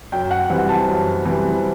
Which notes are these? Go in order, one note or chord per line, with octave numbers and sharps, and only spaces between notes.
F#2 G5
F#5
E3 G3 C4 F#5
A5
F#2
E3 G3 C4